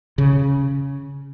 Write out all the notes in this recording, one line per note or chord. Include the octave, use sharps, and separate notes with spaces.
C#3